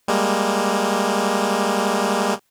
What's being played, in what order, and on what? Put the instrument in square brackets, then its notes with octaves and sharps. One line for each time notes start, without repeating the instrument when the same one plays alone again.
[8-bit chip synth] G3 G#3 A#3